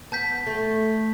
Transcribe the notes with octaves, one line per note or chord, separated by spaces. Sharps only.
B3 A5 G6 B6
A3